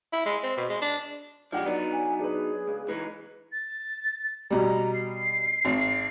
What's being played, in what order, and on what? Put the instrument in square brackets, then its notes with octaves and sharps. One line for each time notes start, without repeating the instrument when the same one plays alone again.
[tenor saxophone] E4
G#3
C4
B2
G#3
D4
[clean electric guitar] F3 G#3 G4 [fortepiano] D4 F#5
[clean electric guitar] F#3 B3 D#4 [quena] D5
[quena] G#5
[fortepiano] D4 B4 [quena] G#4
[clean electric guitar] C#2
[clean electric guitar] E3 G#3 D#4 [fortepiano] B4
[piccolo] A6
[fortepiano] B2 G3 [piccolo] A#5
[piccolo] C7
[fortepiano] G#1